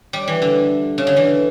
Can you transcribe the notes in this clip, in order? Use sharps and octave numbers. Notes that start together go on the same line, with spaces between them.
G3
E3
D3
C#3
D3
E3